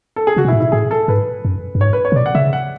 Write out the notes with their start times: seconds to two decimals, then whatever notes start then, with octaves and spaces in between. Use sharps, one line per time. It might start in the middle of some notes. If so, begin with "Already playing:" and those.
0.16 A4
0.27 G#4
0.36 C#3 F#4
0.45 B2
0.48 E4
0.52 A2
0.60 B2 E4
0.72 A2 G#4
0.91 A4
1.08 G#2 B4
1.45 F#2
1.75 F#2
1.80 G#2 C#5
1.93 B4
2.05 C#5
2.12 C#3
2.16 B2 D5
2.26 F#5
2.35 C#3 E5
2.53 F#5